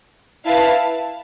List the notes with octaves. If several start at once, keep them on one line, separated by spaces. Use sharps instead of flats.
E4 B4 F5 A5